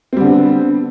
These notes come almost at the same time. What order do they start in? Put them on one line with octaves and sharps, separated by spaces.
C4 G3 D3 B3